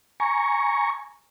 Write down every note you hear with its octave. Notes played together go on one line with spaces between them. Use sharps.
G#5 A#5 C#6